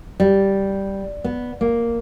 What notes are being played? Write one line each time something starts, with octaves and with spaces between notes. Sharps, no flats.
G3
B3
A#3